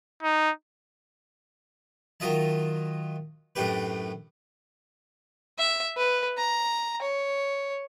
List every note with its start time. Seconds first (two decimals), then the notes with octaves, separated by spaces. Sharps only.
0.23 D#4
2.20 D#3 F#3 F4 D#5 E5 A5
3.55 F#2 A2 A3 D4 G4 B4
5.58 E5
5.97 B4
6.38 A#5
7.02 C#5